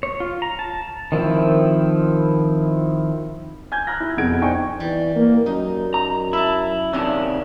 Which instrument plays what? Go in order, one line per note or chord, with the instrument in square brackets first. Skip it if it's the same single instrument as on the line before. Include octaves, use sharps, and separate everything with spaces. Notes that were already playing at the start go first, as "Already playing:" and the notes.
[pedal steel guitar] C#5
F4
A#5
A5
D#3 F3 C4 E4
[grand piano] G#5 G6 G#6
A#5 F6 F#6 A#6
E4
F2 B2 G#4 F#5 G#6 D7
D4 D#4 C5 G5 G#5 C#6
[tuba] E3 [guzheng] G3
[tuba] A#3
[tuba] F#2 [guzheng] D#4
[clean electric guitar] A#5
[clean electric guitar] E4 [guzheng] E5 A5
[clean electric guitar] C3 D#3 C#4 [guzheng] D4 E4 F#5